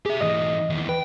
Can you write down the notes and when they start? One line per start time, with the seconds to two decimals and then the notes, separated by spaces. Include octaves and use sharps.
0.06 G4 G#4 E5
0.21 G#2 E3 D#5 D#6
0.70 D#2 E3
0.89 B4 G5